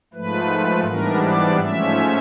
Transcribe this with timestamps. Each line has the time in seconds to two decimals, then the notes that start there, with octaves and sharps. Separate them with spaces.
0.13 G#2 F3 A3 B4
0.86 G#2 E3 G3 B3 D4 A#4
1.23 D5
1.60 G#2 F3 A3 C#4 E5